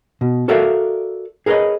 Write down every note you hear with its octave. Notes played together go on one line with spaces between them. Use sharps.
B2
F#4 A4 A#4 D5 E5 F5
G#4 A#4 B4 C#5 D#5